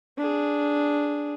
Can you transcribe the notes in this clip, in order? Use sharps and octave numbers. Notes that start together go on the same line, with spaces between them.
D4 G#4